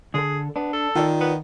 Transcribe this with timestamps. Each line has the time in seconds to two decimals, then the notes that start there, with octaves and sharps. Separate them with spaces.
0.14 D3 G#4 A4
0.56 B3 D4
0.73 A4
0.96 D#3 F4 D5
1.21 B3